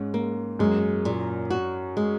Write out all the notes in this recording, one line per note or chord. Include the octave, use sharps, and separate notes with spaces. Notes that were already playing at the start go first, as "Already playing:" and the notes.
Already playing: G#2 G#3 C#4
A#3
F#2 G#3
A#2
F#4
G#3